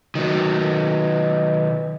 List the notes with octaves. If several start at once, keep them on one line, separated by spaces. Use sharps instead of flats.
D#3 F#3